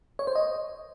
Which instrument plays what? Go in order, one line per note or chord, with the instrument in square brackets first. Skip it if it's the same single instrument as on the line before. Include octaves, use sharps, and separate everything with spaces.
[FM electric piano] C#5
C5
D#5